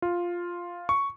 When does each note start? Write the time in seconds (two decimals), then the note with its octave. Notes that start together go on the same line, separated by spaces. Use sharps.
0.02 F4
0.89 C#6